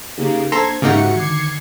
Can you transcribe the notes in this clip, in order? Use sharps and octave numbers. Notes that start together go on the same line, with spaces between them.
C#3 A#3 D#4 G4 G#4
A#3 D4 A4 C5 A#5 C6 G#6
G#2 C#3 A#3 D#4 F#4 G4 E5 C#7
D3 D#3 D6 G#6 C7 C#7